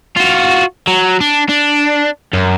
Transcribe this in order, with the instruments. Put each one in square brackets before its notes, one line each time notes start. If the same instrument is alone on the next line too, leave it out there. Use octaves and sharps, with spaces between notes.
[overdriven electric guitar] F4 F#4
F#3
D4
D4
F#2